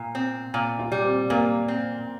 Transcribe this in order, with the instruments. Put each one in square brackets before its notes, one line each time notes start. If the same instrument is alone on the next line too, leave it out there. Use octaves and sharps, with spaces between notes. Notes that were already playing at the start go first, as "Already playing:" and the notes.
Already playing: [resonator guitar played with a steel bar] A#2
C4
A#2
[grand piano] F4
[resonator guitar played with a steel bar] G3
[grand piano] C4
[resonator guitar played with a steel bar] A#2 [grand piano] A#3
[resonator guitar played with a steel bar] C4